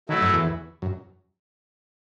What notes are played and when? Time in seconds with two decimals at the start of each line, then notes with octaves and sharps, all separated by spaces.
0.09 D#3 F#3 A3 E4
0.21 F#2
0.33 E2
0.82 F#2